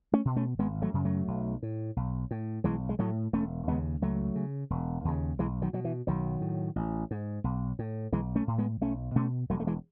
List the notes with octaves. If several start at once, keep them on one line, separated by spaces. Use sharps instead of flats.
A3 C#4
B2
A3 C#4
G#1 G#3 B3
F#3 A3
F#2 C#3
F#3 A3
B1
A2
B1
A2
B1 E3 G#3
G#3
A2 F#3 A3
E1 A3 C#4
D#2 C#3 G#3 B3
C#2 F#3 A3
C#3
E1
D#2 C#3
B1 E3 G#3
D#3 F#3
B2 F#3
E3
B1 D#3 F#3
A2
A1
G#2
B1
A2
B1 E3 G#3
A3 C#4
A2
G#3 B3
B1 A3 C#4
B2 A3 C#4
E1 F#3 A3
A3
E3 G#3